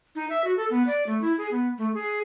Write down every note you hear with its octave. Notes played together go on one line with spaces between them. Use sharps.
D#4
E5
F#4
A4
B3
D5
A3
E4
G#4
B3
A3
G#4